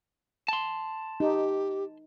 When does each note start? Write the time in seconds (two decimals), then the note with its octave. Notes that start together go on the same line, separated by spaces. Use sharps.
0.48 A5 C6
1.20 D#4 G4